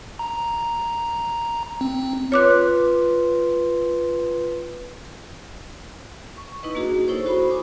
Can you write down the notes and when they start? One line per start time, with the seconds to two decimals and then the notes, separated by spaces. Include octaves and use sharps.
0.19 A#5
1.81 C4
2.32 F4 B4 C#5 C6 D6 F#6
6.37 C#6
6.63 D#4 E4 B4 D#5
6.75 A#3 D4 F#4 G#4
7.08 D#4 E4 A4 C5 C#5 C#6
7.25 E4 F#4 C5 B5 C#6
7.49 G#5 D6 D#6